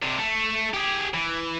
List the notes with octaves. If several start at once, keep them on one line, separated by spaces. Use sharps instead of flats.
C3 D4
A3
G4 G#4
E3